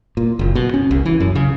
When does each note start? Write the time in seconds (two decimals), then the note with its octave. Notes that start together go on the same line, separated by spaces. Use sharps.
0.17 A#2
0.39 F#1
0.55 B2
0.74 C#4
0.91 C2
1.06 E3
1.20 F#2
1.35 C#3